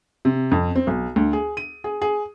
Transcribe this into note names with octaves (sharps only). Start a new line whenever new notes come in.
C3
F2
C4
B1
D2
G#4
D#7
G#4
G#4